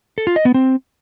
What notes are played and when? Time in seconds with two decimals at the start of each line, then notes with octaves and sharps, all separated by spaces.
0.18 A4
0.27 F4
0.36 D#5
0.45 B3
0.54 C4